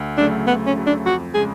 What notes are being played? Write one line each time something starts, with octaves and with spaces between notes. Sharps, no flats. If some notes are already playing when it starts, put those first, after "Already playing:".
Already playing: D2
C#3 F#3 A3 D4
D2 B3
C#4
C#3 F#3 A3
D4
F2 F#4
C#3 G#3 G#4